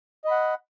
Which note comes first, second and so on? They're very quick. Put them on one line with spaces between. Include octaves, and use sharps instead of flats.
D#5 B5 F#5